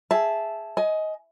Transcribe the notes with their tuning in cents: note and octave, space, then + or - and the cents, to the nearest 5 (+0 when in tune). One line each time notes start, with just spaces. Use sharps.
G#4 +0 E5 +0 A5 -10
D#5 +15 G#5 +25